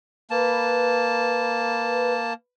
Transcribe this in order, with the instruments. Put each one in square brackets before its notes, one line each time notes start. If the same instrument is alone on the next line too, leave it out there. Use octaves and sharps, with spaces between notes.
[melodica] A#3 A5 [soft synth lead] B4